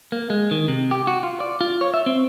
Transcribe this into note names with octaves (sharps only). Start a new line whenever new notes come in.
A#3
G#3
D#3
C3
G4
F#4
F4
D5
F4
C#5
E5
C4